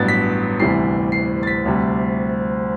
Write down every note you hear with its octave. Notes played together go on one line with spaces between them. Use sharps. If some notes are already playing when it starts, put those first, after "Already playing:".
Already playing: A1 G2 F#3 B3 A6
B6
D2 C3 E3 G3 C7
C7
A6
B6
D2 C3 G3